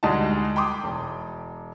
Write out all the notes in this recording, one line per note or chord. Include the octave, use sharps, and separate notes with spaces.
D2 G3 G#3 D#4 F#4 A5
G5 B5 C6 D6 D#6
E1